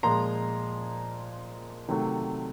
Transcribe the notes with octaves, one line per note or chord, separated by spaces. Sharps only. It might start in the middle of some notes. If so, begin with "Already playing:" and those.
A#2 F3 G#3 A#5 C6
C3 D#3 F#3 A3